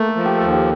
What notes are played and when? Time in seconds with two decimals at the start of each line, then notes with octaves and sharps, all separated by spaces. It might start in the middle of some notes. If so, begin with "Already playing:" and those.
Already playing: A3 A#3
0.08 A4
0.16 F3
0.25 G4
0.38 D#2 A4
0.53 G4